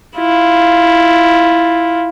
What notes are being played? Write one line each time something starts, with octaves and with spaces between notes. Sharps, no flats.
E4 F4